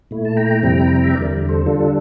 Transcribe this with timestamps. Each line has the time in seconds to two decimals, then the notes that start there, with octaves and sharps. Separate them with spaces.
0.11 A#2 A3 E4
0.25 A5
0.37 G5 A#5
0.63 F2 C3 G3 C4 E4 G5 A#5
1.04 E5
1.14 E2 D3 G3 A#4 D5
1.49 A4 C5
1.66 D3 G3 D4 F4 A4